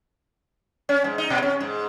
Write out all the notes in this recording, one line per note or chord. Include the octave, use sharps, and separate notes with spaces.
C#4
G#2
D#4
B2
C#4
G#2